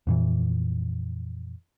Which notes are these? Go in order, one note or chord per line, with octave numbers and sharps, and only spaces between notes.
F2 A#2 E3